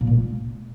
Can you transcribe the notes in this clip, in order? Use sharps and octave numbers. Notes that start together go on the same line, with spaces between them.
A#2
A3
G#3